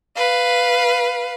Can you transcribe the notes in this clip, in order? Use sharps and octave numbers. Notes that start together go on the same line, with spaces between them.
B4 F5